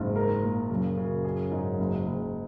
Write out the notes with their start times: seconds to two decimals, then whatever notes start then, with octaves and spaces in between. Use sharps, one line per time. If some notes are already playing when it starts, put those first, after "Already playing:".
Already playing: F#1 G#2
0.16 A#4
0.43 A#2
0.69 F#2 C#3
0.97 C#3
1.25 G#4
1.51 G#2
1.78 F#1
2.06 F#1